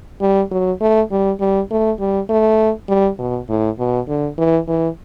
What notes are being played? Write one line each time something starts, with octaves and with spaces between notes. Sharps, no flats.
G3
F#3
A3
G3
G3
A3
G3
A3
G3
B2
A2
B2
D3
E3
E3